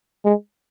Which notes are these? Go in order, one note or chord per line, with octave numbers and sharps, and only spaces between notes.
G#3